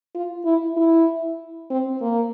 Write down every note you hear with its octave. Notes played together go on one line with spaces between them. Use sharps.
F4
E4
E4
C4
A#3